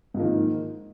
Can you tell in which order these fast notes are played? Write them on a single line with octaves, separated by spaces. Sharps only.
G#2 F3 A#3 D#3